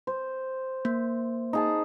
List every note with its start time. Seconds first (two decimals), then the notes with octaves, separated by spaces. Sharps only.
0.07 C5
0.85 A#3
1.53 D#4 G#4 A5